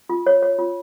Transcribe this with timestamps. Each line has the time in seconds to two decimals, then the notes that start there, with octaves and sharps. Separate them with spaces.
0.09 F4
0.27 C#5
0.42 C#5
0.59 F4